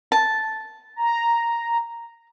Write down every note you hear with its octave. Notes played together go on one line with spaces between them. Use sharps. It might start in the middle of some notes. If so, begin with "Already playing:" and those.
A5
A#5